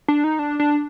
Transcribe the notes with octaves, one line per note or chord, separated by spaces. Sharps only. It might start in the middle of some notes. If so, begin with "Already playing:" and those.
D4
D#4
D4
D4